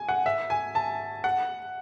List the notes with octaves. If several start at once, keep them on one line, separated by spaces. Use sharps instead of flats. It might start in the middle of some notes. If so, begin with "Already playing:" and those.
Already playing: G#5
F#5
E5
G#5
A5
F#5